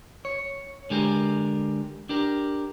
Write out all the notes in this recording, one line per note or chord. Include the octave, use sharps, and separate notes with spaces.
C#5
D3 G#3 G4 A#4
D4 G4 A#4